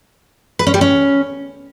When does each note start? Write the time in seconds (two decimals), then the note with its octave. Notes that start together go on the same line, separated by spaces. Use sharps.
0.59 B4
0.67 C#4
0.74 G3
0.81 C#4